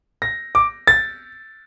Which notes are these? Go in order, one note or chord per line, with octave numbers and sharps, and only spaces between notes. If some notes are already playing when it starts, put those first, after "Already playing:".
A#6
D6
A6